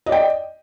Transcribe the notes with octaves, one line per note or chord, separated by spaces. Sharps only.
D5 D#5 G5